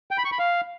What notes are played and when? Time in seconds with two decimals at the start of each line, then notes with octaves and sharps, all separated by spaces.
0.11 G5
0.18 B5
0.25 C#6
0.32 B5
0.39 F5